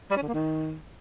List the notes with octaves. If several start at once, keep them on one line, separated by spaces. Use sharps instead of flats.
G3
C#4
D3
A#3
D#3